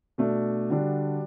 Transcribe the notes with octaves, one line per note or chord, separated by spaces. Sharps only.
B2 A3 D4
D3 G3 D4 F#4